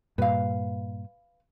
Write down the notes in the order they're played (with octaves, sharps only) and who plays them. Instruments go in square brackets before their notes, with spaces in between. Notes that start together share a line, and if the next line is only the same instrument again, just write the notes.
[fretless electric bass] G2 A#2 [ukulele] B4 F5